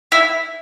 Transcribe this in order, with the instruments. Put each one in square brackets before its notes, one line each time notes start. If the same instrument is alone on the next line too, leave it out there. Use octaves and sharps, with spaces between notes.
[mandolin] E4